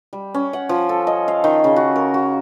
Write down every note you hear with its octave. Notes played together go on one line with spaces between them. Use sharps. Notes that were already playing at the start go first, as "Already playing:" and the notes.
G3
C#4
F#5
F3
A4
D#5
F5
D#3
C#3
F#4
A#4
F#4